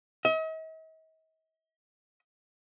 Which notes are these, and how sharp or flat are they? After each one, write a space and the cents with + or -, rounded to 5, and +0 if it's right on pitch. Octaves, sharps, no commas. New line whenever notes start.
D#5 +45